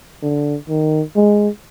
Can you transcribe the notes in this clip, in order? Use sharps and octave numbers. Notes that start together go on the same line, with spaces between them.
D3
D#3
G#3